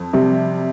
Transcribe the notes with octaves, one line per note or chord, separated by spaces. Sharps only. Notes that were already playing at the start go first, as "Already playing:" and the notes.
Already playing: F2
C3 G3